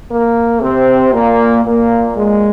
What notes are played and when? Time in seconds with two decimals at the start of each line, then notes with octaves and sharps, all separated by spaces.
0.11 A#3
0.61 C3 C4
1.13 A#2 A#3
1.64 A#2 A#3
2.16 G#3